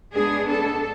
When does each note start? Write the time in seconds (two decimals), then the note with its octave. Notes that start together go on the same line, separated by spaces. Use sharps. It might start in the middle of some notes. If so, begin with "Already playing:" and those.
0.14 G#2 G#3 B3 D4 G#4
0.49 A4